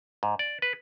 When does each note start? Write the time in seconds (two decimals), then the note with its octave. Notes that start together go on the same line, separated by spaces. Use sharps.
0.23 G#2
0.39 D5
0.62 B4